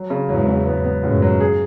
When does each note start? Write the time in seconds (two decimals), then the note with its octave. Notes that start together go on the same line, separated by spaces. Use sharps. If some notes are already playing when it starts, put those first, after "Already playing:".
Already playing: F#3
0.10 C#3
0.29 E2 G#2 F#3
0.48 C#3
0.67 B3
0.85 B3
1.03 C#2 F#2 A2
1.22 F#3
1.40 G#4